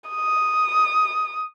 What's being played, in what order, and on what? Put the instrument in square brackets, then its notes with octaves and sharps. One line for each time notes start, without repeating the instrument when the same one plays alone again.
[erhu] D#6